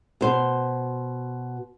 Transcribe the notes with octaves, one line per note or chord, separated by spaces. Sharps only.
B2 C5